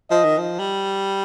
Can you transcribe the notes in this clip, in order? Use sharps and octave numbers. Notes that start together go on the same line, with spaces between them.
F3 D#5
D#3
F3
G3